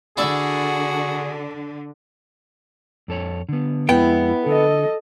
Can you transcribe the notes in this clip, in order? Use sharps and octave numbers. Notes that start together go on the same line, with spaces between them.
D3 E4 F#4 G#4 D5 E5
F2 A4 C#5
D3 B3
F2 G#3 B3 E4 G5
D3 A4 D#5